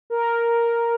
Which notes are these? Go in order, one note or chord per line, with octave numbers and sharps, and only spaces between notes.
A#4